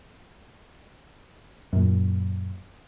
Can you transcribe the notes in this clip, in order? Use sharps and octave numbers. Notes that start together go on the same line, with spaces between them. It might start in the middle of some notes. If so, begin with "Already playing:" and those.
F#2 A#2